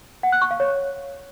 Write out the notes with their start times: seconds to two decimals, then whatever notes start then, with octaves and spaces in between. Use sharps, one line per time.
0.23 F#5
0.32 F#6
0.42 C#6
0.51 F5
0.60 C#5